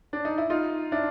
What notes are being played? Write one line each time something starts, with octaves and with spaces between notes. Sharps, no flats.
D4
D#4
E4
D#4 F4
D4 E4